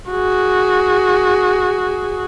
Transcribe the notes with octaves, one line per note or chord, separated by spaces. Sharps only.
F#4 G#4